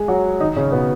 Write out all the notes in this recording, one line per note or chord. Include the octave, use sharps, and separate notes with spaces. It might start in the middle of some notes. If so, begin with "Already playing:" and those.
Already playing: G#3 G#4
F#3 F#4
D#3 D#4
C#3 C#4
B2 B3